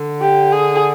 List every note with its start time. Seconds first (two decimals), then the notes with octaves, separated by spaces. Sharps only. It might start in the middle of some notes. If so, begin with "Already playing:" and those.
Already playing: D3
0.21 G4
0.52 G#4